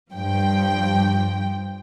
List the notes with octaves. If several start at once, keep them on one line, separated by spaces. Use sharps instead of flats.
G2 F3 G5